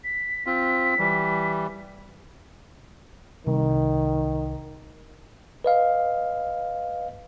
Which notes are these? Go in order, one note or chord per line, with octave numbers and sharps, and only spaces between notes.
B6
C4 F4
E3 G3
C2 D#3
B4 D#5 F5